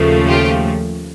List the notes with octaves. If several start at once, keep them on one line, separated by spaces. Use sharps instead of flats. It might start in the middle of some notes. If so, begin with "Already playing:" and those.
Already playing: D#2 C#3 F3 A3
F4 G4